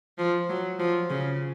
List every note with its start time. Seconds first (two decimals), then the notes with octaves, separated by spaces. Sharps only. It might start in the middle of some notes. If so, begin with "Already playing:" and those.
0.18 F3
0.49 F#3
0.79 F3
1.10 C#3